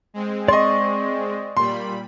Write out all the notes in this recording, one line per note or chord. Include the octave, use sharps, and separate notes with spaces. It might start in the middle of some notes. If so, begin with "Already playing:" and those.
G#3 C4
D5 D#5 C6 C#6
A#2 G3 B5 C6